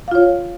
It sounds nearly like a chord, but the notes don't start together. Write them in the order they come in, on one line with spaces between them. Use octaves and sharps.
F5 F4 C#5